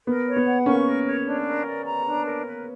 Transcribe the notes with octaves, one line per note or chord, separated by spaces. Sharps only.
B3 A#4
C#5
B3
F#5
A#3 C#4 C#6
A#4
C#5
D4
A#4
D5
A#5
D4
A#4
B4